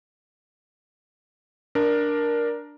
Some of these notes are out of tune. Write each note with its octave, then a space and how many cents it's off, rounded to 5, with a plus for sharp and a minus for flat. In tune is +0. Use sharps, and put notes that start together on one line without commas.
D4 +0 A#4 +10